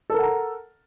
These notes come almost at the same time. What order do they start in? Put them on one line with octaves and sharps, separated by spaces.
A4 A#4 F#5 A#5